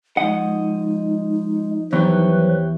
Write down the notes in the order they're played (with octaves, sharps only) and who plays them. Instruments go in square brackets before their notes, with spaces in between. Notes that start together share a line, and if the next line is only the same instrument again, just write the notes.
[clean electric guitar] F3 D#5 [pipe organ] G#3 [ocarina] D#4 [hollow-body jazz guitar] F#5
[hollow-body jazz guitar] E2 [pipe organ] F3 F#3 B4 [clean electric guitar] E4 G4 C#5